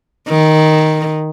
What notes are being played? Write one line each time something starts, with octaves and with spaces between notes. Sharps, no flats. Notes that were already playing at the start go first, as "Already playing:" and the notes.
D#3